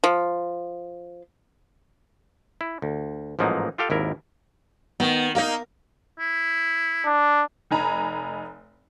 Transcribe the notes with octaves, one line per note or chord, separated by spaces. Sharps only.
F3
E4
D2
A1 G#2 F3 F#3 A#3 D#4
F4 G4 A4 F5 G5
G#1 D#2 E4 A#4
D#3 B3
A#3 D#4 A#4 F5
E4
D4
F1 D#4 G#5 A#5 B5